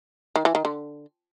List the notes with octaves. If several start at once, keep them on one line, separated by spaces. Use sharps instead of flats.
D#3
E3
D#3
D3